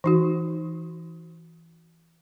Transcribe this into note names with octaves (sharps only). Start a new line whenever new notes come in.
E3 D#4 F#4